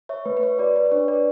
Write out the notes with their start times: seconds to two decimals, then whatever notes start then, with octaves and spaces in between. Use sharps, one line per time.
0.09 C#5 E5
0.25 A3 B4
0.37 B4
0.43 C#5
0.58 F#4 B4 D5
0.76 B4
0.86 B4
0.92 D4 C#5
1.08 B4 D5